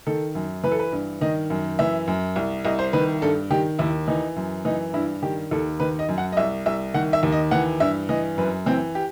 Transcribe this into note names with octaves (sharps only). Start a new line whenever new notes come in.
D#3 A4
F#2
E3 B4
A4
B4
G2
D#3 D#5
F#2
E3 E5
F#2
C2
C2 D#5
C5
D#3 B4
G2 A4
D#3 G4
D#2 E4
E3 D#4
F#2
E3 D#4
G2 E4
D#3 G4
D#2 A4
D#3 B4
D#5
F#2
F#5
D#5
C2 E5
C2 E5
D#3 F#5
E5
D#2
D#5
E3 F#5
G2 E5
E3 D#5
F#2 B4
E3 C4
G4